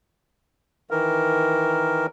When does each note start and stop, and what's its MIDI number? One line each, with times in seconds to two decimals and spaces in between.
0.91 2.06 51
0.91 2.06 52
0.91 2.06 70